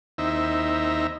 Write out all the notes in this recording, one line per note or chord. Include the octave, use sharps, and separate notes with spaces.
D#2 C4 D#4 E4 E5 A#5